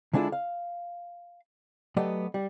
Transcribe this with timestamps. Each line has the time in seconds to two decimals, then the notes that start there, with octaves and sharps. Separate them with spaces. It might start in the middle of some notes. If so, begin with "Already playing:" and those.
0.13 D3 G#3 D4 E4 F4
0.32 F5
1.97 F#3 A3 B3 G4 D5 D#5
2.34 G3